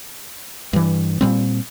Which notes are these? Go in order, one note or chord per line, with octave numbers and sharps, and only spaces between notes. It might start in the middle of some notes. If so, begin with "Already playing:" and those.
G2 E3
A#2 G3 C4